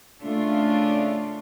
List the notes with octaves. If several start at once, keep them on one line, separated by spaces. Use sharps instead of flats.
C#3 A3 D4 F4